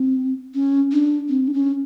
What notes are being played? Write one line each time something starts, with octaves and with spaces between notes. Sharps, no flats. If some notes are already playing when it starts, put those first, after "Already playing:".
Already playing: C4
C#4
D4
C4
D4
C#4